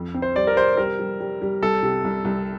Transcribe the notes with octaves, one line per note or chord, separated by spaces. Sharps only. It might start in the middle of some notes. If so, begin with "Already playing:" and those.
Already playing: F2
C4
C5
G3 D5
A#4
C3 C5
G3 A#4
G3
G3
G3
C2 A4
C3
C2
C2